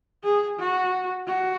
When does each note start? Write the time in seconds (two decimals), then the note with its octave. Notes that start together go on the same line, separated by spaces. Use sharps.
0.24 G#4
0.59 F#4
1.27 F#4